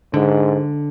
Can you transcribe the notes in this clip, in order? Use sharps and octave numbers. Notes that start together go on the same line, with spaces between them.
G#2 D3